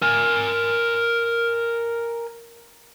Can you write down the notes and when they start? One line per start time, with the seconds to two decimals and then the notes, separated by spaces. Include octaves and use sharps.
0.02 A#4 G#5